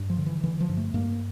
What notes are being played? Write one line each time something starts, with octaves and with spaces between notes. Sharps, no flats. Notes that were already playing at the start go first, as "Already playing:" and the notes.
Already playing: G2
F3
D3
E3
D3 E3
F3
G2
A3
G2 A#3